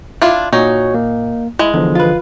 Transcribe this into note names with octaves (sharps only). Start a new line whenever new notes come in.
D4 E4 F4
A#2 D#4 F#4 C#5
A#3
G#3 E4
E2 D3 E3 F3
F4 B4